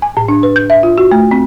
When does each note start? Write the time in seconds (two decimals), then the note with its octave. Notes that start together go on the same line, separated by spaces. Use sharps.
0.02 G#5
0.17 A2
0.28 D4
0.43 B4
0.56 G6
0.70 E5
0.83 F4
0.98 F#4
1.12 A3
1.31 C4